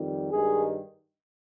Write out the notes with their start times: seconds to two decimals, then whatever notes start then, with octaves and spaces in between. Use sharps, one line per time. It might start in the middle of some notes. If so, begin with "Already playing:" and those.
Already playing: F2 D#3 G3
0.32 G2 D#3 G3 G#3 G#4